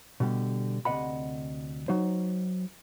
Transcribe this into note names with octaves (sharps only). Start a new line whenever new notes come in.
B2 D3 G3 G4
D2 C3 D#5 F#5 B5
F#3 D#4 C5